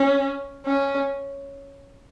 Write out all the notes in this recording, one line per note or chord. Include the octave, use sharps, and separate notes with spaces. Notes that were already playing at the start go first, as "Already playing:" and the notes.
Already playing: C#4
C#4